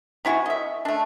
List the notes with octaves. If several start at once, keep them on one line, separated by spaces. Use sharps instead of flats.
C3 E4 F#4 G#5
D#5 E5
A3 D4